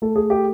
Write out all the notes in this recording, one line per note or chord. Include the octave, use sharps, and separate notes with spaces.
A3 A4
G#4
G4